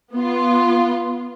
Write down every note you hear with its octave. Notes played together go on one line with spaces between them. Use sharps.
B3 F4